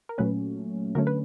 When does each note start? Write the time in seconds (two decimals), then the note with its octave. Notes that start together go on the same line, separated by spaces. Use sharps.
0.09 A#4
0.18 A#2 F#3 A3 C#4 B4
0.95 D3 F#3 A3 C#4 A#4
1.07 B4